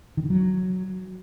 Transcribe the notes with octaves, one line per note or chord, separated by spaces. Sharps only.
D#3
D3
F#3